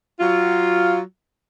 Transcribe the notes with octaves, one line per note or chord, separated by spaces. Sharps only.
F#3 F4